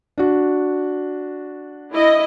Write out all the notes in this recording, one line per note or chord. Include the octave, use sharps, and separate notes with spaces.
D4 F#4
E4 D#5